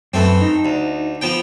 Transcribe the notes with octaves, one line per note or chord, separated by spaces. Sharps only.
F#2 A3 C4 B4
D#4
D2
F3 B3 G5